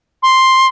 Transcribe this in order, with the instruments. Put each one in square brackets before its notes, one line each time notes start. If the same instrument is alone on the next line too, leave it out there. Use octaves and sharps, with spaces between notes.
[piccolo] C6